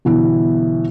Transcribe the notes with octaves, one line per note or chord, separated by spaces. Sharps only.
G1 B2 E3 E4